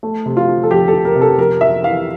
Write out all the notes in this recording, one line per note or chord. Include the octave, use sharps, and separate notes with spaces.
A3
C3
F4
F3
A4
F2 G4
A4
F3
A#4
C3
A4
F2 A#4
F2 E5
E3 F5